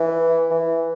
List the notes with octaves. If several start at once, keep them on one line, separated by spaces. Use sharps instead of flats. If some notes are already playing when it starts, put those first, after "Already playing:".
Already playing: E3
E3